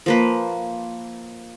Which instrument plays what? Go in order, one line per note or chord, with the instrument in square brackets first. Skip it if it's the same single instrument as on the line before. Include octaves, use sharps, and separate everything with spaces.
[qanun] F3 A#3 B4